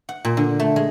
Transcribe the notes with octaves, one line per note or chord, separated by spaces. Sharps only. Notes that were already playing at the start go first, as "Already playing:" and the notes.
F#5
A#2
D3
A3
G#3